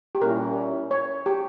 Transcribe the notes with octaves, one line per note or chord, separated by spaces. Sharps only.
G4
A#2 G3 C#4 E4 A#4
C#5
G4